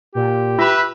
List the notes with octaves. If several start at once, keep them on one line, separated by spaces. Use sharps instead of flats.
A#2 G4
F4 B4 E5 B5